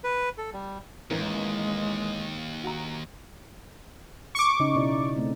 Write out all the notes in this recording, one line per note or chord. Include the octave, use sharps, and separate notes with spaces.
B4
A4
G3
A1 D#2 E3 G#3 A#4
F#4 A#5
C#6 D6
C#3 D#4
B2 E4 D5
A3 C4 C#4